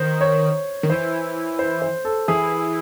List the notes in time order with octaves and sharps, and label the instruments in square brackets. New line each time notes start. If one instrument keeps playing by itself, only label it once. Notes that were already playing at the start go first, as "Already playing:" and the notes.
Already playing: [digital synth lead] D#3 [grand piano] C5
[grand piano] C#5
[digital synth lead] D#3
[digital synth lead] E3 [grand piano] C5
[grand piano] C5
C5
A4
[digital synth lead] E3 [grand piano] G#4